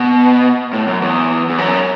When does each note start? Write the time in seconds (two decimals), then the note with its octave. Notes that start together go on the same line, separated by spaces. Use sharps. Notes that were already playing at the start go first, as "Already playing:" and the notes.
Already playing: B2
0.73 A2
0.87 F#2
1.02 E2
1.50 E2
1.58 F#2